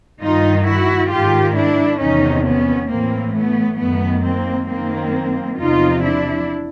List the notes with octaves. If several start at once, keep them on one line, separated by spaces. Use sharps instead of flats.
G2 D#3 D#4 F4
E4 F#4
G#2 D#3 F4 G4
D4 E4
E2 C3 D#3 C#4 D#4
B3 C#4
A2 E3 A#3 C4
A3 B3
F#2 D#3 A3 B3
A#3 C4
F#2 D#3 A#3 C4
E2 C3 F3 D#4 F4
D4 E4